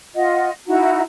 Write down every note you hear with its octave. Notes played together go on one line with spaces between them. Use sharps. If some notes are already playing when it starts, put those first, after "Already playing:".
F4 D#5 F#5
D#4 E4 F#4 A#5